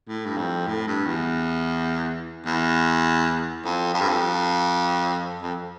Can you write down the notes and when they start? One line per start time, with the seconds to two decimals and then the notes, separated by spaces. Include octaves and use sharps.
0.08 A2
0.26 G2
0.37 F2
0.67 A2
0.87 G2
1.06 E2
2.45 E2
3.64 F2
3.94 F2
4.01 G2
4.08 F2
5.42 F2